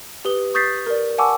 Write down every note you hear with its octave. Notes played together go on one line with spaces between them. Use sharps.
G4 B4 D#6 G7
C#6 D#6 G6 A6 B6 C7
A#4 D5
F#5 G#5 A5 C#6 D6 E6